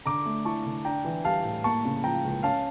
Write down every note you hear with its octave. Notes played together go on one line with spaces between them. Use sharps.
D3 A#5 D6
A3
E4 A5 C#6
D3
D4 G5 A#5
E3
G3 F5 A5
A2
A#3 A5 C#6
C#3
F3 G5 A#5
C#2
C#4 F5 A5